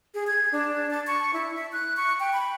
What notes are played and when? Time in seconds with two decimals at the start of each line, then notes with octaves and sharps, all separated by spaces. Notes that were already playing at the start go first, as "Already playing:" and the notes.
0.14 G#4
0.27 G#6
0.52 D4
0.91 A5
1.07 C#6
1.33 E4
1.55 E5
1.72 F#6
1.97 C#6
2.20 G5
2.33 B5